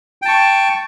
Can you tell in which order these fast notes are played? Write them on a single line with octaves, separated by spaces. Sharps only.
G5 A5 C#6